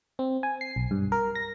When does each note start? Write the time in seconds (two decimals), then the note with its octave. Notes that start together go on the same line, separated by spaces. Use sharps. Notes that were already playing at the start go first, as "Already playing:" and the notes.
0.19 C4
0.43 G#5
0.61 C7
0.76 B1
0.91 G2
1.12 A#4
1.35 A#6